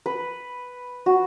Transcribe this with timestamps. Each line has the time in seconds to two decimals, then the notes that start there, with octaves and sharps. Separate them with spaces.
0.06 B4
1.06 F#4